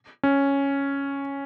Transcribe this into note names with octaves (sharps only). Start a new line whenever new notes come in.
C#4